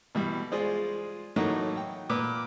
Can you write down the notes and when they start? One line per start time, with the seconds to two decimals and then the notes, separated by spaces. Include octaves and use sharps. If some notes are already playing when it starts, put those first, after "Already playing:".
0.15 B2 E3 G3
0.52 G#3 F4 G#4 C5 D5
1.36 A2 E3 F#3 A3 A#3 D#4
1.77 G5
2.09 A#2 B4 D6